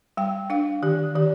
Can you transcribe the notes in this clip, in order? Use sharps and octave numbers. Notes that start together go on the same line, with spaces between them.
G3 G5
D4 F5
D#3 G4
D#3 G4